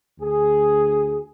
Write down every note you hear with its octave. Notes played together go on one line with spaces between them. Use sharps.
D2 G#4